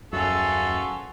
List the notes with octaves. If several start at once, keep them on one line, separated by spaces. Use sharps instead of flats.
D#1 F#2 B2 C#4 F4 F#4 G#4 A4